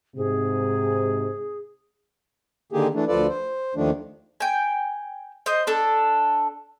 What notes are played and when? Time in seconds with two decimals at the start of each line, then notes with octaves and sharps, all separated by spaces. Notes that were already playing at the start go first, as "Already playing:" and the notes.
0.16 G#2 C3 G#4
2.72 D3 D#3 A#3 G4 G#4
2.94 E3 A3 D4
3.08 D2 F3 F4 A4 B4 D5
3.28 C5
3.75 D#2 D#3 F3 A3 D4
4.40 G5 G#5
5.46 C5 D#5
5.67 D4 A4